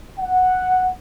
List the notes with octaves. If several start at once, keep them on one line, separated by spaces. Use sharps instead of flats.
F#5